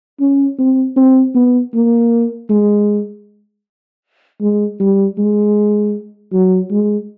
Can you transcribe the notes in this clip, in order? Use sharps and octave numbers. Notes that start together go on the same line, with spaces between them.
C#4
C4
C4
B3
A#3
G#3
G#3
G3
G#3
F#3
G#3